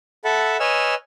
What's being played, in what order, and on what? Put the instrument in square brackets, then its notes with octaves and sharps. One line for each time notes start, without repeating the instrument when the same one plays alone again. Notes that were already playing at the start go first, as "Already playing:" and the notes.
[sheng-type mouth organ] A4 E5 F#5 A5 B5
B4 C#5 D#5 G#5 E6 F6